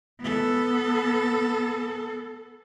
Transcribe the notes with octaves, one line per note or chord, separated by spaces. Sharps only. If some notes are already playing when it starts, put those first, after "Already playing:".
B3 A4